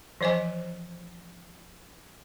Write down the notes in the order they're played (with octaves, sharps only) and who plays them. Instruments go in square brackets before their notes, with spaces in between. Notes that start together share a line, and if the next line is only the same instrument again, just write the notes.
[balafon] E3 F3 C5 D#5 G#5